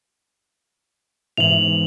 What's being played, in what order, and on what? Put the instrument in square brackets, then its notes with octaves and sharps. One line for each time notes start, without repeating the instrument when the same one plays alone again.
[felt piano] G#2 E3 B3 [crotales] F7 F#7